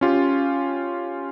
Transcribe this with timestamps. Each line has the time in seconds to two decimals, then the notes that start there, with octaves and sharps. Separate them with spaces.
0.01 C#4 F4 G4